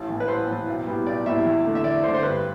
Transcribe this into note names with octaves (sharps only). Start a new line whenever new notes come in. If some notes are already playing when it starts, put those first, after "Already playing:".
Already playing: A1
A2 E3
B4
A1 C5
A2 E3
B1
A2 G3 B3
B1 D5
A2 G3 B3 E5
E2
D3 A3
E5
E2 D5
D3 A3 C5
C5
G2 B4